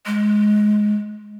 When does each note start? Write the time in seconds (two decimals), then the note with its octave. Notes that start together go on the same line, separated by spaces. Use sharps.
0.06 G#3